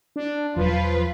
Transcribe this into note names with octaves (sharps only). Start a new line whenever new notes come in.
D4
E1 F3 F#3 F4 B4